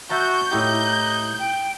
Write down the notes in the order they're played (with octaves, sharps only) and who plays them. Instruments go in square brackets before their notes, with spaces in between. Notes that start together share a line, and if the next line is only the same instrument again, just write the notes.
[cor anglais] F#4 [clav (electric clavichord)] E5 A5 A#5 [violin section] G6
[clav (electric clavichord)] A2 E4 G4 [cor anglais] D#4
[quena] G5